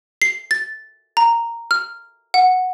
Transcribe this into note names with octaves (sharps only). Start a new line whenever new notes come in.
C7
A6
A#5
F6
F#5